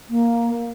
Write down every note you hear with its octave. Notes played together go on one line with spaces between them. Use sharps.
A#3